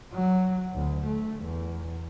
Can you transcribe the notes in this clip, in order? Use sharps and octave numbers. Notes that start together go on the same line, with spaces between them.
F#3
D2
A3
E2